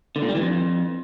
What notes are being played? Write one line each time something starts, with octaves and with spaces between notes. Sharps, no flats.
D3
A#2
G3
E3
F2